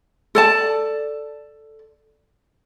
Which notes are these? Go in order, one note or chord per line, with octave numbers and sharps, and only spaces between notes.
A4 D5 A5